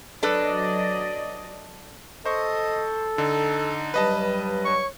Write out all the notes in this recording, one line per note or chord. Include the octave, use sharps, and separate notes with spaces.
F#3 D4 A4 B4 D5 D#5
A4 C5 D#5 C#6
D3 D#4
G2 F#3 G3 B4 D#5 A5
C#5 C#6